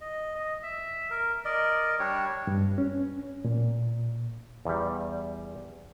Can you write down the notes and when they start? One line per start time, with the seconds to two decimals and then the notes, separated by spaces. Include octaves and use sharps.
0.01 D#5
0.35 D#5
0.63 E5
1.10 A#4
1.45 A#4 D5 D#5
1.99 G3 D4 C#5
2.47 G2
2.78 C#4
3.45 A#2
4.65 E2 G3